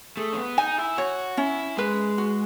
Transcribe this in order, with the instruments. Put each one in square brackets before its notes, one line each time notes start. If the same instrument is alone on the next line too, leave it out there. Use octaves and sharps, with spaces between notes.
[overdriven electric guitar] A3 [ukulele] G#4
[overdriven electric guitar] C#4
B3
[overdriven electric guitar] D#4 [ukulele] G#5
[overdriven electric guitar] E4
[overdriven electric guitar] F#4 [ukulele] C#5
[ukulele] C#4 [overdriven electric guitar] E4
[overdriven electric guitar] G#3 [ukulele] B4
[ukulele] F#4